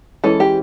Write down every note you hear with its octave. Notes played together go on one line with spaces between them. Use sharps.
E3 G#3 C#4 A4
G4